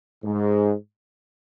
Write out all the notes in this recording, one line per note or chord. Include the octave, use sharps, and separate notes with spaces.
G#2